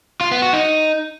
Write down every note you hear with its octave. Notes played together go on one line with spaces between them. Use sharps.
F4
B3
F#4
D#4